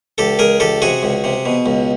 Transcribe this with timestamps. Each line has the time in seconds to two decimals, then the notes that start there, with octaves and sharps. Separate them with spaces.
0.18 C#2 G4 A4
0.39 C#2 G#4 A#4
0.60 C#2 G4 A4
0.82 C3 F#4 G#4
1.03 C#2
1.24 C3
1.46 B2
1.66 C#2